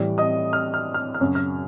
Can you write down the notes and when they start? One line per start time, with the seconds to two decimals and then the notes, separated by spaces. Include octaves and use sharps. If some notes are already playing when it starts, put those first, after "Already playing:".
Already playing: A2 E3 G3 D5
0.18 D#5 D#6
0.53 F6
0.74 F6
0.94 F6
1.14 F6
1.20 F#2 C#3 F#3
1.35 F6